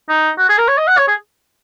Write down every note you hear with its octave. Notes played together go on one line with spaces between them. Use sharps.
D#4
F#4
G#4
A#4
C#5
D#5
F#5
C#5
G#4